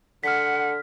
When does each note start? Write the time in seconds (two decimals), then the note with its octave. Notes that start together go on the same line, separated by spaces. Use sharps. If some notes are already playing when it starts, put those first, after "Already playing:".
0.24 D3 F#5 F6 B6